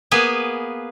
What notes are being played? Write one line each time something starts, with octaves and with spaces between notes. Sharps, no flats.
A#3 B3 G#4 B4 G#5